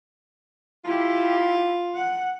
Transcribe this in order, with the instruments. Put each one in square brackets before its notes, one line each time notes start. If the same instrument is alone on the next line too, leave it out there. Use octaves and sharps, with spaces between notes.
[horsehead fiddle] E4 G4 [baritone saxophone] F4
[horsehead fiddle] F#5